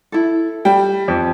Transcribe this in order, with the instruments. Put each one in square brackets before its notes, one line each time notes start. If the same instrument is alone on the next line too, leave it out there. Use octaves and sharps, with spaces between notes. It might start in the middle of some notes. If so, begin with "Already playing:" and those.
[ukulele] E4 A4
[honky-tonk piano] G3 [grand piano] G5
[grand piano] F2